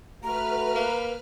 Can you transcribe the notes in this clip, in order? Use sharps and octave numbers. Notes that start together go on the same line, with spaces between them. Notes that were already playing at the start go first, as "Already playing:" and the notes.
A3 F#4 B4 A#5 F6
A#3